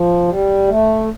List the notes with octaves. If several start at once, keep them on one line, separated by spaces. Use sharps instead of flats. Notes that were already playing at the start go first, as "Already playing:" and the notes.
Already playing: F3
G3
A3